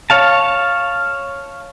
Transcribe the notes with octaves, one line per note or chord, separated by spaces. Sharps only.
C#5 F5 A5